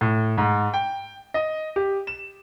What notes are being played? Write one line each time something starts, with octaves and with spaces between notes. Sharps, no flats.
A2
G#2
G5
D#5
G4
E7